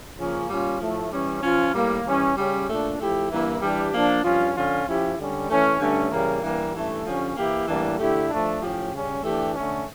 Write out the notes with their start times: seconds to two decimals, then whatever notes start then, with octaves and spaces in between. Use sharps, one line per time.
0.17 C#3 F3 A#3 C#4
0.49 A#2 G3 C#4 F4
0.80 A2 F3 A3
1.11 E3 G3 C#4
1.43 F3 C#4 F4
1.74 A2 G3 A#3
2.05 E3 G3 C#4
2.36 C#3 G3 C#4 G4
2.68 A#2 A3 D4
2.99 F3 A3 E4 G4
3.30 G2 E3 A#3 E4
3.61 E3 G3 D4 G4
3.93 F3 A#3 D4
4.24 G2 F3 C#4 F4
4.55 D3 F3 C#4 F4
4.86 F3 C#4 E4 G4
5.17 D3 G3 C#4
5.49 E3 A3 C#4
5.79 G2 D3 A3 C#4
6.11 C#3 E3 G3 A#3
6.42 G2 E3 G3 A#3
6.74 G2 E3 A3 C#4
7.05 D3 F3 C#4 G4
7.36 E3 A#3 E4 G4
7.67 A2 E3 G3 A#3 D4
7.98 D3 A3 E4 G4
8.30 F3 A3 D4
8.61 A2 F3 C#4 G4
8.92 C#3 G3 C#4
9.23 E3 A3 D4 G4
9.54 D3 A3 C#4